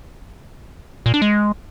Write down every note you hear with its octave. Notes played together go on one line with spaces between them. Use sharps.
A#2
D4
G#3